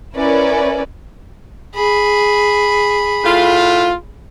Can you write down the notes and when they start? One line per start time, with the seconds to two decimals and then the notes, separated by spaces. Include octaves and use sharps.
0.15 C#4 E4 A#4 B4 D5
1.75 G#4 B5
3.24 A2 F4